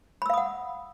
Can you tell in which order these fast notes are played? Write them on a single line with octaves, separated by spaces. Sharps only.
B5 E6 F5 D#6 F#5